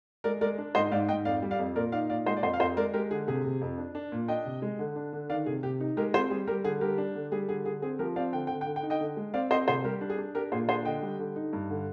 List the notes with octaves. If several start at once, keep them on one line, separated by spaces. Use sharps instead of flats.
G#3 A#4 D5
G#3 A#4 D5
D4
G#2 C5 D#5
D#5
G#2 D5 F5
G#2 D#5 G5
F2 D5 F5
G3
D5 F5
F2
A#2 A#4 D5
D#4 D5 F5
A#2 D5 F5
G#3 C5 D#5
D5
F2 C5 D#5
F5
F2 C5 D#5
G#3 A#4 D5
G#3 G4 A#4
D3 G#4
C3 G#4
C3
F2
D4
D4
A#2
D4 D#5 G5
C3
G#3
D3
D4
D3
D#3 D5 F5
C3 G#4
C3 G4
D#4
G#3 G4 A#4
C4 G#4 C5
G3 G#4
G3 G4 A#4
D3 G#4
G3 G4 A#4
D4
D3
G3 G#4
D3 G#4
D3 G#4
C4 G#4
F3 G4 A#4
C4 D5 F5
D3 G5
G5
D3
G5
D3
G5
D#4
D#5 G5
D3
G#3
C4 D5 F5
C4 C5 D#5
C3 G#4 C5
G3 G4 A#4
D4
G#4
D4
D4 G4 A#4
A#2 G#4 C5
D4 G#4 C5
D3 D#5 G5
G3
D3
D#4
G2
D3